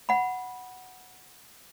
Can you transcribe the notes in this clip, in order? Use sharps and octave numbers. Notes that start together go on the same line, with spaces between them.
F#5 B5